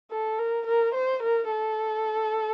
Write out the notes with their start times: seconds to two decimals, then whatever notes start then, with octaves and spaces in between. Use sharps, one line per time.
0.11 A4
0.39 A#4
0.67 A#4
0.95 C5
1.23 A#4
1.51 A4